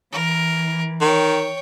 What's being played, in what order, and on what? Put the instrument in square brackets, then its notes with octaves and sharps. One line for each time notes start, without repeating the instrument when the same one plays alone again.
[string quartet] E3 [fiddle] A#4
[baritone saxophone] D#3 [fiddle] C#5 G5